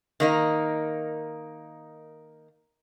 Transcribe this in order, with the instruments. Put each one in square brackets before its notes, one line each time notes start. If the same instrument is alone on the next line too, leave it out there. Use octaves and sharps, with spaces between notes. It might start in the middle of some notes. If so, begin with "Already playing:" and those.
[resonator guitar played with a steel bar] D#3 A#3 D#4